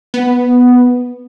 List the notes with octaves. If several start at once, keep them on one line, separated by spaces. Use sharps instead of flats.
B3